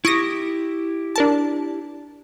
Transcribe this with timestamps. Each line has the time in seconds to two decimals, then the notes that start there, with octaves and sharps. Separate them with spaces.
0.05 E4 G4 C#6 D#6 A#6
1.16 D4 A#4 A5